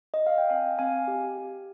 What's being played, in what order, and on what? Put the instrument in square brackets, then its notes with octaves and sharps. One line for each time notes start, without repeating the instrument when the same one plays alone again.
[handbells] D#5
F5
G5
C4 F5 G#5
C4 F5 G#5
G4
G4